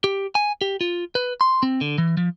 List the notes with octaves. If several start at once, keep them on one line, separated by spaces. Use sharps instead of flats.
G4
G#5
G4
F4
B4
C6
C4
D3
E3
F3